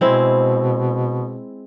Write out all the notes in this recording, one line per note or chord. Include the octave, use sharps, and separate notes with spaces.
B2 G#3 C4 E4